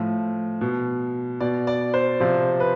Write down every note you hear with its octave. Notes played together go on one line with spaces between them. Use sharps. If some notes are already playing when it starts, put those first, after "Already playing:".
Already playing: A2 F3
B2
B2 D5
D5
C5
C3 F3 C5
B4